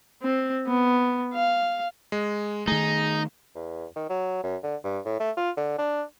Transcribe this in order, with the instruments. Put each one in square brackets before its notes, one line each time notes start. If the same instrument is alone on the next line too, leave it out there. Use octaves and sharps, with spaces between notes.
[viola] C4
B3
F5
[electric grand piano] G#3
[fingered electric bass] D#3 A3 [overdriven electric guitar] D#4 [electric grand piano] G#4
[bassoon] E2
D#3
F#3
F#2
D3
G2
A2
A3
F4
D3
D4